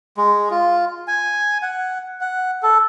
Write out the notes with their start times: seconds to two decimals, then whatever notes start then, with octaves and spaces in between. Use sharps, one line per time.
0.17 G#3
0.51 F4
1.08 G#5
1.62 F#5
2.21 F#5
2.63 A4